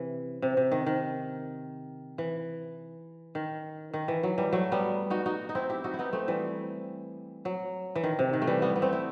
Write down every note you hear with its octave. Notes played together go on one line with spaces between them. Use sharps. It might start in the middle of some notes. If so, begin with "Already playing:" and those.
Already playing: C3 E3
C3
C3
D#3
D#3
E3
D#3
D#3
E3
F#3
E3 G3
F#3 A3
G3 B3
D#4 F#4
D#4 F#4
D#4
C4 E4
E4 G4
D#4 F#4
E4
B3 D#4
A3 C4
E3 G3
F#3
E3
D#3
C3
D#3
A3
E3 G3
G3 B3
B3
A3 C4
E4